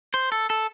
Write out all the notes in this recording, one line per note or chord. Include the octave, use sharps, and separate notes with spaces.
C5
A4
A4